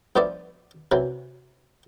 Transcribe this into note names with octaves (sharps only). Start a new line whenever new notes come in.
G2 F3 B3 C5 D5 E5
C3 E3 F#3